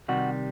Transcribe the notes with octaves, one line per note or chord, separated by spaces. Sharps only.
C3 D#3 G3 F#4